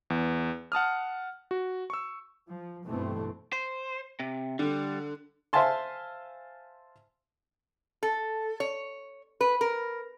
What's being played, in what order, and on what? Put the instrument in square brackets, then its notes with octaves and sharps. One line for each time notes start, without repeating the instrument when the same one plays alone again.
[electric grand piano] E2
F#5 A5 D#6 F6
F#4
C#6 E6
[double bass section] F3
B1 G2 B2 E3 A3 C4
[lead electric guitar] C5
C3
[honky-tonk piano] D3 [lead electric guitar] G3
[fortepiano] C5 E5 F5 G#5 A5 C6
[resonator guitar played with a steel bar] A4
C#5
B4
A#4